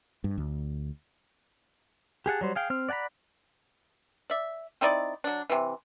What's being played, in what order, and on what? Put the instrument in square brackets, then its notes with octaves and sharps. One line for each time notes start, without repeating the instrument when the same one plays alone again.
[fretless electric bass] G2
D2
[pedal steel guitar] G4 G#4 F#5 A5
F#3 G3 C5
G#4 F5 G5
C4 F6
D5 F#5 G#5 A#5 B5
[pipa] D5 E5
C4 D#4 E4 D5
F#3 D4
C3 E3